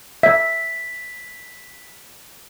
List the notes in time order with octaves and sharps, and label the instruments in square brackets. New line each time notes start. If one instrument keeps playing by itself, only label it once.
[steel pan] E5 [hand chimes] B6